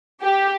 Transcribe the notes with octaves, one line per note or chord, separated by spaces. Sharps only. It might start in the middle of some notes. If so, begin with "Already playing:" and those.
G4